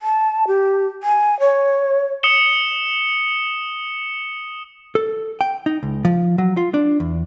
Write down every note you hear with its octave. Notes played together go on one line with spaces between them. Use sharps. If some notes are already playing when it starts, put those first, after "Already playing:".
A5
G4
G#5
C#5
D#6 C#7 E7 G7
A4
G5
D#4
C#2
F3
F#3
F4
D4
E2